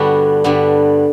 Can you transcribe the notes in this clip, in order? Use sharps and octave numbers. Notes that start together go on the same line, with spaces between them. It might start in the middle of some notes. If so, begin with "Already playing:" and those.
Already playing: G2 D3 G3 B3 F#4
G2 D3 G3 B3